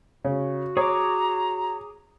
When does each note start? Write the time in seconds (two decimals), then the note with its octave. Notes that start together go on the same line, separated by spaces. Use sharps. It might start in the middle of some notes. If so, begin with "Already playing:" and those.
0.25 C#3 F#4
0.77 G#4 C#5 A#5 D6